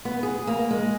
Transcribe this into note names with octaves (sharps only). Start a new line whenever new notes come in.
B3
G#4
A#3
G#3